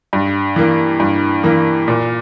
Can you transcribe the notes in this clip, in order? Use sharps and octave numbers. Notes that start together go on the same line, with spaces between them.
G2
E3 A#3
G2
E3 A#3
A#2